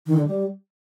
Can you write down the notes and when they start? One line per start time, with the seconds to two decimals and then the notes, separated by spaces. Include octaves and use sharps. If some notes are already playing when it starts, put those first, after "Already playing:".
0.06 D#3
0.17 D3
0.27 G3